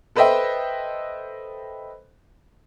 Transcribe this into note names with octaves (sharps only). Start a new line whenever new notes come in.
A4 B4 C5 D#5 E5 G5